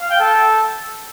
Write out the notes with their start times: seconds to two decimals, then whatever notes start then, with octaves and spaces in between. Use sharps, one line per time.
0.01 F5
0.10 G5
0.20 A4